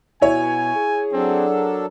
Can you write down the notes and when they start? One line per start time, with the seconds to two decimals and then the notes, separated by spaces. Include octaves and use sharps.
0.22 B2 E4 C#5 G#5
0.75 G#4
1.13 F#3 C4 D4 A4
1.53 A#4